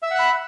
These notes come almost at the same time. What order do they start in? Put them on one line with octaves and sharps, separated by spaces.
E5 E6 F#5 F#6 B5